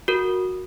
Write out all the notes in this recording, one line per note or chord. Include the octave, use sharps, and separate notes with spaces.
F#4 A#4